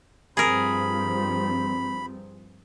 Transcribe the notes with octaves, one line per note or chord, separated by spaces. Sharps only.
G2 F3 C4 G#4 A#4 B5